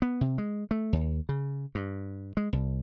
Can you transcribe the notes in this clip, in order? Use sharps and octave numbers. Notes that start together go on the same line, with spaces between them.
B3
C3
G#3
A3
D#2
C#3
G2
G#3
C2